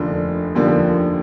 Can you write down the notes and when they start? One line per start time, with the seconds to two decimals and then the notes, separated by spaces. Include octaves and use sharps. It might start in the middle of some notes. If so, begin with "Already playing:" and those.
Already playing: F1 D#2 D3 F3
0.55 F1 D#2 D3 F3